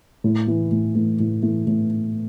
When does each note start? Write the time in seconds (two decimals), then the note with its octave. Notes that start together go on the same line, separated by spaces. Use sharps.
0.24 A2
0.47 E3 A3
0.72 A2
0.95 E3 A3
1.20 A2
1.43 E3 A3
1.67 A2